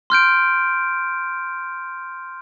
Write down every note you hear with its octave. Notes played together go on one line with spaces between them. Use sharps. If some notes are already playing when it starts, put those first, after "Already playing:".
C6 F6 G6 D7